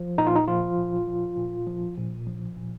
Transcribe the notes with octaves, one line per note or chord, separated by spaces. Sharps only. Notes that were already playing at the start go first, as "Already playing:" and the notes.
Already playing: F3
A#2 D#4
F4
D#4
F3 F4
A#2
F3
A#2
F3
A#2
F3
A#2